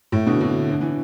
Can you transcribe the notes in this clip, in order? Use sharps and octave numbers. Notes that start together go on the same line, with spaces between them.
A2
B2 D3
B2 D3
D3
E3